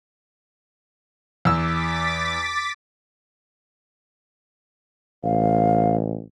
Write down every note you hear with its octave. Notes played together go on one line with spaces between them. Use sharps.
E2 D6 E6 A6 B6
A1 F5